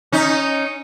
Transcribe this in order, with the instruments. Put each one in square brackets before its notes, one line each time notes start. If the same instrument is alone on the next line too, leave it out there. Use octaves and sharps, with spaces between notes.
[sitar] C#4 D#4